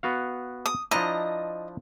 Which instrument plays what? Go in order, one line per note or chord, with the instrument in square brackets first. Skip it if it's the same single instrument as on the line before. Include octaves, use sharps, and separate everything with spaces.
[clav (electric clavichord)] B3 F#4 F5
[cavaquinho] D#6
[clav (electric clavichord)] F3 D4 E4 [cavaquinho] D#5 A#5